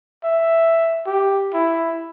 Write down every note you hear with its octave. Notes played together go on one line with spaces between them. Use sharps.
E5
G4
E4